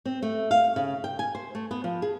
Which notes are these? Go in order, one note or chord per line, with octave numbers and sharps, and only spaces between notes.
C4
A3
F5
C#3
G5
G#5
C5
A3
B3
F3
G#4